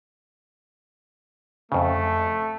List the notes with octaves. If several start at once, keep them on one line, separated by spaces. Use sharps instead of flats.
F2 C#3 A3